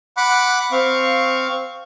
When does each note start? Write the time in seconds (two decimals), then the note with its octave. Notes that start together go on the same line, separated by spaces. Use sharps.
0.17 F#5 B5 D6 F#6
0.72 C4 F5 C#6